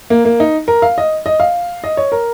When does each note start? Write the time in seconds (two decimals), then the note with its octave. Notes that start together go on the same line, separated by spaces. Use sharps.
0.10 A#3
0.25 A#3
0.40 D#4
0.68 A#4
0.82 F5
0.98 D#5
1.26 D#5
1.40 F5
1.84 D#5
1.97 C#5
2.12 A#4